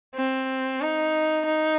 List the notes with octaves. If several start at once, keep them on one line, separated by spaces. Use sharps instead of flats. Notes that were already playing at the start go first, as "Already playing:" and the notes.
C4
D#4
D#4